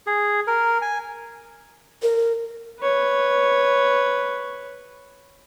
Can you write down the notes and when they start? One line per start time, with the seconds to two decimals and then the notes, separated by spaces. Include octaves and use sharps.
0.07 G#4
0.47 A#4
0.82 G#5
2.02 A#4
2.81 B4 C#5